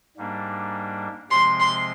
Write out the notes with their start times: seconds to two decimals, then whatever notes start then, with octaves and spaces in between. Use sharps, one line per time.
0.17 G#2 G3 A#3 D4
1.31 C3 F3 G#3 C4 C6
1.60 C6